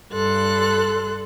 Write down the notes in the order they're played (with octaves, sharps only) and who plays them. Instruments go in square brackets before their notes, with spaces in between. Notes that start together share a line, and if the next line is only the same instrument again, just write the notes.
[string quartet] G2 A4 C6 F#6